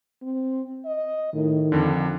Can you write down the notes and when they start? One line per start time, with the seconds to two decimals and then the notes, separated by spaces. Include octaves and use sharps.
0.22 C4
0.85 D#5
1.34 A2 D#3
1.72 F2 D3 F4